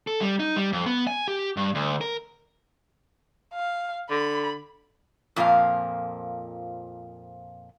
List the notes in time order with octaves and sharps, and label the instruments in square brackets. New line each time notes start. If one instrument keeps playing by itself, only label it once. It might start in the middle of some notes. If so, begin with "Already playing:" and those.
[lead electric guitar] A4
G3
D#4
G3
F2
B3
G#5
G4
G2
D2
A#4
[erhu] F5
[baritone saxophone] D3 [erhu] B5
[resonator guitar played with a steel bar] F2 A#2 F3 A#3 F5